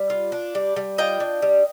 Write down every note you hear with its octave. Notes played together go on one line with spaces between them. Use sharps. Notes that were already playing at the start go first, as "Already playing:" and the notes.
Already playing: G3
F4
D4
G3
G3
F4 D#5 G5
D4
G3